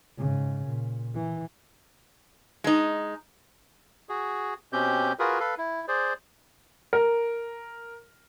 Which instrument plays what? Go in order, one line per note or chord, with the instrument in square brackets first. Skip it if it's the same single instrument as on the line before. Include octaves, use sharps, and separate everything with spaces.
[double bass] G#2 C#3
A#2
E3
[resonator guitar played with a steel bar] G#3 D#4
[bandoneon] F#4 G#4
B2 C4 C#4 G4 G6
F4 F#4 G#4 A#4 B4
A4 B4 F5
E4
G#4 C5 D5
[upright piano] A#4